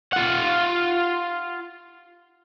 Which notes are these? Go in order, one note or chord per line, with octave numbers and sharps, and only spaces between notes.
F4 F#5